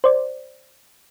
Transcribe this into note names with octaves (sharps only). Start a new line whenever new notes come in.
C5 D5